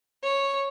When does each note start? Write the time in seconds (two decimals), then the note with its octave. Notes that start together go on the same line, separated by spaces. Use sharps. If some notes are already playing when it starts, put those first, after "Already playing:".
0.23 C#5